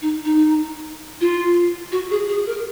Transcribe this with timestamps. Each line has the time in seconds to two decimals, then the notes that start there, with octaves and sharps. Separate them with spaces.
0.02 D#4
0.25 D#4
1.21 F4
1.92 F#4
2.11 G#4
2.29 G#4
2.47 A#4